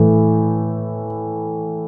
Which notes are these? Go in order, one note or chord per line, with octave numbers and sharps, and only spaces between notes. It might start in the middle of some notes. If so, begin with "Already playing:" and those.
Already playing: A2 E3 A3